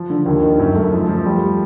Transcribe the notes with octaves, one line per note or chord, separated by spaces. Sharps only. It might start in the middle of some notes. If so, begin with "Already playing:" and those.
Already playing: F3
D3
D#2
D#3
F#2
A3
F3
F3
G3